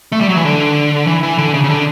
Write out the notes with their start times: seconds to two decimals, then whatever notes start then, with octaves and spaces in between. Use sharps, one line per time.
0.12 A3
0.21 G3
0.29 F#3
0.37 E3
0.45 D3
1.07 E3
1.23 E3
1.38 D3
1.54 C#3
1.64 C#3
1.69 D3